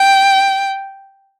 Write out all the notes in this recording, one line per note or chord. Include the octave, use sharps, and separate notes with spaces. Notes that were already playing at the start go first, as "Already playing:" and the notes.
Already playing: G5